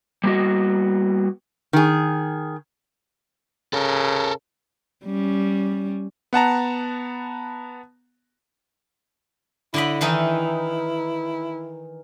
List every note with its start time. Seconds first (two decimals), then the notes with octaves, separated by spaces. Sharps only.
0.24 G3 A#3 B3 D4 F#4 D#5
1.73 D#3 G#4
3.73 C#3 A4 A#4
5.05 G3 C#4
6.33 B3 F#5 A5 A#5
9.74 D3 E4 D#5 B5
10.01 D#3 E3 D#4